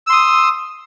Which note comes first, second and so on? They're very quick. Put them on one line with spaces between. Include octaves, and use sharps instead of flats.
E6 C6 D#6